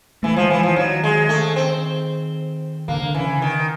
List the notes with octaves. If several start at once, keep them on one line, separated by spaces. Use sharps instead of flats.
E3 A3
F3 G#3
E3 F3
E3 F3
D#3 F#3
G#3
A3
C4
D3 A#3
D3
C#3 E3
D#3